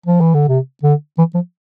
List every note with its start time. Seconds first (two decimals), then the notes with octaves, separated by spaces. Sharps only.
0.06 F3
0.21 E3
0.34 D3
0.48 C3
0.83 D3
1.18 E3
1.35 F3